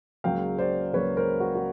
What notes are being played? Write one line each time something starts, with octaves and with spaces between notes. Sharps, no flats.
C#2 C#3 F#3 A#3 F5 G5
C5 D5
C#2 C#3 F#3 A#3 B4 C#5
A#4 C5
F#4
F#4